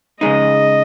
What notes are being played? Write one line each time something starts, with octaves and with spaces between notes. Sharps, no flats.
C#3 G#3 D#4 D#5